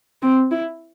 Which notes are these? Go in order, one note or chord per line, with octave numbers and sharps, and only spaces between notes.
C4
E4